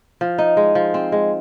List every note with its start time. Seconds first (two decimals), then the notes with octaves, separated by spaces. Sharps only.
0.21 F3
0.38 D#4
0.57 G#3
0.75 F3
0.94 C4
1.12 G#3